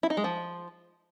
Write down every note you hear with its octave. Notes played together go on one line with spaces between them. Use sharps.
E4
D#4
G#3
F3